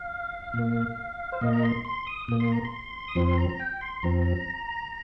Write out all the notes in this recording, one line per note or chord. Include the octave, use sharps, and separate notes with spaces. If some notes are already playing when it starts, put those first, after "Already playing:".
Already playing: F5
A#2 A#3
C5
A#2 A#3 D#5
A#5
C6
C6
D#6
A#2 A#3 D#6
C6
A#5
C6
D#6
F2 F3 C4 C6
A#5
A#5
G5
C6
F2 F3 C4 A#5